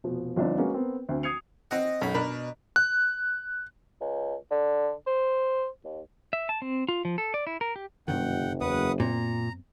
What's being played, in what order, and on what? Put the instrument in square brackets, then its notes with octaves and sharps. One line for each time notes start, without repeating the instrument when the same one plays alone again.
[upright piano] F1 B2 F3
G1 F3 C4 D4 D#4
G#3 A#3 C#4 F#4 B4
B3 C4 A#4
D2 C4
D#6 G#6 C7 C#7 F7
[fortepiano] C4 F#5 [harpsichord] D#5
[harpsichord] B1 B5 [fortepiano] F#2
[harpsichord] B2 [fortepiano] D4 A#4 B5
[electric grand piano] F#6
[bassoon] C#2
D3
C5
D#2
[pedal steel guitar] E5
A5
C4
F4
F3
A4
D5
E4
A#4
G4
[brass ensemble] F#1 [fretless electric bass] G2 C3 D#3 [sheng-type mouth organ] F#5 G5
[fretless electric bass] E2 [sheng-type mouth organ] B4 F#5 D#6
[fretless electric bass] F#2 B3 C4 [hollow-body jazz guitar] A#2 [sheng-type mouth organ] A#5